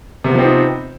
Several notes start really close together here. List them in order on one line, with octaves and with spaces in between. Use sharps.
C3 B3 F3 C4 D#4